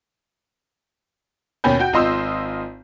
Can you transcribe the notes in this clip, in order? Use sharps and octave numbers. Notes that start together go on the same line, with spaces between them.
D#2 B2 C#4 G#5 B5 G6
F#4 G5 G6
G#1 F4 D#5 C6 D#6 E6